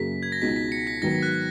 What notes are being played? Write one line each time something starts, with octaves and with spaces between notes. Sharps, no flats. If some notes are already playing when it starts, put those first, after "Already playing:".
Already playing: F#2 C#3 F#3 A#3 B6
G#6
A#6
C#2 B2 G#3 D#4 B6
B6
C#7
B6
G#2 D#3 F#3 B3 A#6
F#6